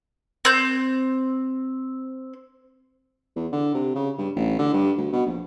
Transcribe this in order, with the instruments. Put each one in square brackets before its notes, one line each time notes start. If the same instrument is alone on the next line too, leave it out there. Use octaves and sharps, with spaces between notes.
[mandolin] C4 G6
[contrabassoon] E2
D3
C3
C#3
G2
A1
D3
G2
D2
B2
A#1